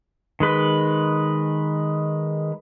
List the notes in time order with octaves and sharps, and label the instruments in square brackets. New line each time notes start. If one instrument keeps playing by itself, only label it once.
[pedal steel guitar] D#3 G#3 B4